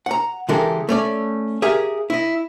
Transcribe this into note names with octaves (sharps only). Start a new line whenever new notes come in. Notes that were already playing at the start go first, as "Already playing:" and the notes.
F#5 A#5
C#3 E3 G#3 G4 A4 A#4
A3 C#4 D5
G4 G#4 A#4 E5 F5
E4 D#5